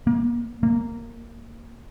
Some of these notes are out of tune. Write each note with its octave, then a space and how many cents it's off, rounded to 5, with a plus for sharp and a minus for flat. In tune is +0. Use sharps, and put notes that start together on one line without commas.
A#3 +30
A#3 -10